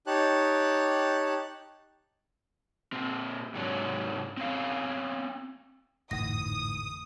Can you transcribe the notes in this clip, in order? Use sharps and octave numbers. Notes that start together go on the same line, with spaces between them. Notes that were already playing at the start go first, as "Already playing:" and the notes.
D#4 G4 C#5 A5 F#6
A#2 C4
G#2 C3 F#3 D4 C#5
C4 C#4 F5
G#1 F2 A2 D3 E3 D#4 D#6 A#6